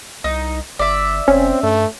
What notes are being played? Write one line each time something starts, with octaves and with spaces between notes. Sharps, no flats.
C2 D#4
G1 D5 E5
F1 C4 C#4
G2 A3